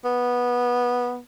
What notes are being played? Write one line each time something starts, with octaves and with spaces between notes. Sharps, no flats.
B3